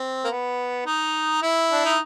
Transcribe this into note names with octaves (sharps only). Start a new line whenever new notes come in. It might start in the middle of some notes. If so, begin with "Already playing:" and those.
Already playing: C4
A#3
B3
D#4
E4
D4
D#4